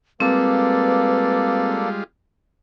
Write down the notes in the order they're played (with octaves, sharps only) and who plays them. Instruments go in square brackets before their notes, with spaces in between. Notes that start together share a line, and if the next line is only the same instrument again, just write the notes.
[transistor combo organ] G3 G#3 F4 [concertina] A#3 A4 D5 [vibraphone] C4 [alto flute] B4